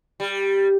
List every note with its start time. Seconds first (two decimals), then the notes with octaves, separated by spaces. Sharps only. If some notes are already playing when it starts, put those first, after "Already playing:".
0.20 G3